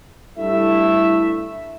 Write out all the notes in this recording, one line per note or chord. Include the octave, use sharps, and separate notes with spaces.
G2 A3 E4 E5